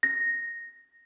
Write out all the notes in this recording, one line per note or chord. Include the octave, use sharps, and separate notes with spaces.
A#6